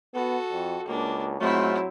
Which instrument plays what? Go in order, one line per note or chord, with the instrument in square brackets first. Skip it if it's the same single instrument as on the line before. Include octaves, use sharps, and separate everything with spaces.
[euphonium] B3 [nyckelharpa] F#4 A4
[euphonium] F2
[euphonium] C#2 [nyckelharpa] A#3 D4
[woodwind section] G#2 A3 F4 [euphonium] F#3 [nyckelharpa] C4 E4